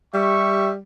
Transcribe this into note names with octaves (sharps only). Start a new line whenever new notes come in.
G3 G4 E5 C#6